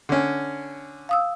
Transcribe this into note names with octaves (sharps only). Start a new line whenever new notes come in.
D3 C#4
F5 D#6 E6